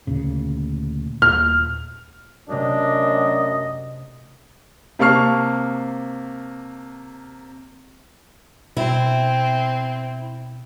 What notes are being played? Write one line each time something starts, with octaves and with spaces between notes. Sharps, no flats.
D2 A#2 C#3
D#1 F6
F#2 C3 A3 D4 D#5
C3 A#3 A5 C#6 F6 C7
B2 C4 E4